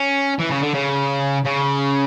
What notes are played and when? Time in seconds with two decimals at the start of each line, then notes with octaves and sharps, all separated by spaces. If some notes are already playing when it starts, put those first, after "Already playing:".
Already playing: C#4
0.39 E3
0.51 C#3
0.62 D3
0.74 C#3
1.45 C#3